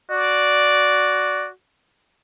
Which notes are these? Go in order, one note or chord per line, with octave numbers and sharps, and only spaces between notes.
F#4 D5